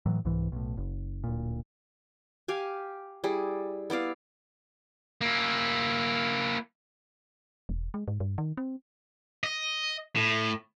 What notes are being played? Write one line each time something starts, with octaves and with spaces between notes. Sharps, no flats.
A2 E3 F#3
C2 G#2 E3
B1 A2
F#1
D1 A#2
G4 F5 G#5
G3 E4 G#4
B3 E4 D5 F5
A#3 E4
E1
G#3
G#2
G2
D#3
C4
D#5
A2